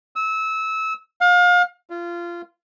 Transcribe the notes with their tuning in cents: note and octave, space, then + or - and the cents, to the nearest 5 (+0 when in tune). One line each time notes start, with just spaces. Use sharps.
E6 -25
F5 +35
F4 -20